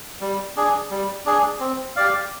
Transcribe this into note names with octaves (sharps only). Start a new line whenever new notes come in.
G3
D4 G#4
G3
D4 G#4
C4
G4 D5 F5